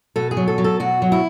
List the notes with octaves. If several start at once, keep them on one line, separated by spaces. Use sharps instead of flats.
B2 A4
G#4
F#3
A4
F#3
A4
B2 F#4
F#3
E4